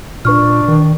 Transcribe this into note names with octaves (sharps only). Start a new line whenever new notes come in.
A#2 D4 B4 C#6 F6
D#3